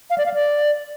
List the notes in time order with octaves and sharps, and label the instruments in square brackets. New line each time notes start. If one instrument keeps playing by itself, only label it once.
[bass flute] F5
D5
F5
D5